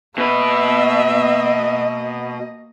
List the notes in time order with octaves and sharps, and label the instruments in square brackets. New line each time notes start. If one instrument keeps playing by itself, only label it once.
[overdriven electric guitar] B2 B4 [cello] A#3 D#5 [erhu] E5